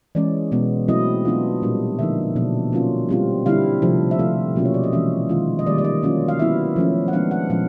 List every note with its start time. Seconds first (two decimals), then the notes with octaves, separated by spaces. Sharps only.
0.15 E3 G#3 C#4 D5
0.52 B2 G#3 B3
0.88 F#3 A3 C4 E4 D#5
1.25 F#3 B3 D4 F4
1.62 A#2 G3 A#3 D4
1.99 D3 F3 A#3 D#4 E5
2.36 B2 F#3 B3 D4
2.73 F#3 A#3 C#4 F4
3.09 G3 C4 F4
3.46 D3 G3 C4 E4 F5
3.82 C3 F3 A3 D4
4.11 E5
4.19 F3 A3 C4 F4 F5
4.56 B2 F#3 A#3 C#4 F4
4.65 C#5
4.74 D5
4.84 D#5
4.92 E3 G#3 C#4 E5
5.29 D#3 G#3 C#4 F4
5.59 D#5
5.66 D#3 G3 A#3 D5
5.78 D5
5.85 D#5
6.03 F#3 A#3 C#4 F4
6.28 F5
6.39 F#3 B3 E4 E5
6.76 F3 A3 C#4
7.08 F#5
7.13 F3 G#3 B3 D4 F5
7.31 F#5
7.50 A#2 F3 G#3 C#4 F5